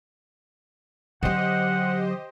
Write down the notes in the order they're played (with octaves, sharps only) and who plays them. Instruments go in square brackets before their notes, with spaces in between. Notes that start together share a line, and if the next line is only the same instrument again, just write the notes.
[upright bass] D3 F#3 [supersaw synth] G4 C5 D#5 [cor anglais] F#5